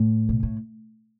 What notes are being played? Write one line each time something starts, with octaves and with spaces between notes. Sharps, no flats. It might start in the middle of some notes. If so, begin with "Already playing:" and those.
Already playing: A2
B2
A2